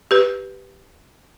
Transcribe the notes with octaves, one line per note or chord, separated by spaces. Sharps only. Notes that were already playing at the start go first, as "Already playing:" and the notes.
G4 B4